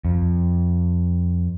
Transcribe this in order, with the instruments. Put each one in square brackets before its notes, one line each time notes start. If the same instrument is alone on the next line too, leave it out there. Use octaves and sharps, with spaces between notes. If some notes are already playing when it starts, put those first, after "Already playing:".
[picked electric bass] F2